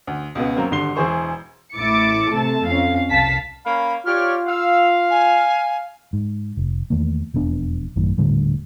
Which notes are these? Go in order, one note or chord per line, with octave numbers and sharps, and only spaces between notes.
D2
C#2 B2 B3
F#2 F#3 A#3 C4
G#1 G2 D3 C6 C7 G7
E1 E3 G#4 C5 C#6
A1 A2 E4 D6 A6 C#7
C3 A3 A4 A5
F2 C#4 F5
C2 F5 A5 B6
A#3 C#4 F5 B5
F4 G4 C#5 D5 F6
F5 E6
G#5
G#2
F1
E2 D#3 A3 A#3
E1 F2 B3 D4
A1 F#2 A2 D#3
D#1 A2 D3 G3